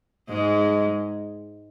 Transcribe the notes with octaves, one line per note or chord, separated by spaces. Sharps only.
G#2 G#3